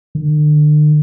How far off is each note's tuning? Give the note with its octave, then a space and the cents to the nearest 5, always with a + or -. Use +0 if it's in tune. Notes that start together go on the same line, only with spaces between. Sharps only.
D3 +40